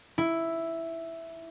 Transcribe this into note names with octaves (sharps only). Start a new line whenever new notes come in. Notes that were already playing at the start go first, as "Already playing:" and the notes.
E4